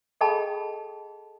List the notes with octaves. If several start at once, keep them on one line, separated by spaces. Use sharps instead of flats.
G#4 A4 D#5 G5 A5 B5